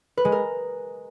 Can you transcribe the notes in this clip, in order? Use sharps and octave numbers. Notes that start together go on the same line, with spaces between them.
B4
G#3
A#4